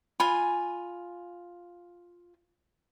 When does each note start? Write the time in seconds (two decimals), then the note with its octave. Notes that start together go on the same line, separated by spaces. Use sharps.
0.20 F4 G#5 B5